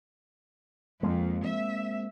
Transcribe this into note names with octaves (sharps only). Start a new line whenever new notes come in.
F2 G#3 A#3 C4
E5